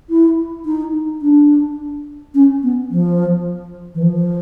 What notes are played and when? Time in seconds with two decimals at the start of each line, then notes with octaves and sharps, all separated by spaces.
0.10 E4
0.66 D#4
1.22 D4
2.35 C#4
2.63 B3
2.91 F3
3.95 E3
4.03 F3